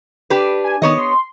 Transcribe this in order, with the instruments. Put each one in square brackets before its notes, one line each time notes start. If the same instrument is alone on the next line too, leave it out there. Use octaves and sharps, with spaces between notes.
[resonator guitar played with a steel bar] D4 G4 B4
[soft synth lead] G#5
[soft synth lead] D#3 [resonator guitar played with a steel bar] B3 C#5 D#5
[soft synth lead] C6